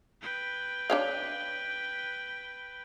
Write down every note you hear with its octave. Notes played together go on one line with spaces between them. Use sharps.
B4 G5
D4 C#5 F5